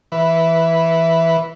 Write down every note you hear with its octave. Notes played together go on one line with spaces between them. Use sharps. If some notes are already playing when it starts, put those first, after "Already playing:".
E3 B4